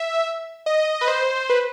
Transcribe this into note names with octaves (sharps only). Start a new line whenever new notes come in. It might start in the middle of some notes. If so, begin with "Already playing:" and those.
Already playing: E5
D#5
B4
C5
B4